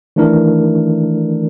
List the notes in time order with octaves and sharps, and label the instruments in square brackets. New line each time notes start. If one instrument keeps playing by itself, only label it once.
[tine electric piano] D#3 E3 A3 D4 E4 A#4